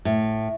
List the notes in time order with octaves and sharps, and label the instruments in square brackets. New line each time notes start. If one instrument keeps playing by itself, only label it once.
[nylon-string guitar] A2